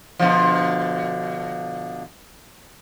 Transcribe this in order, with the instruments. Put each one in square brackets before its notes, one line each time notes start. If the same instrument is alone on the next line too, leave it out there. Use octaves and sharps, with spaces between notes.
[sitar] B2 D3 F3